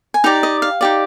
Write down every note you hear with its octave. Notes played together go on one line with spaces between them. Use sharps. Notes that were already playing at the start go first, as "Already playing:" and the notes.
G#5
D#4 G4 D5 A#5
D#5
F5
D#4 G4 D5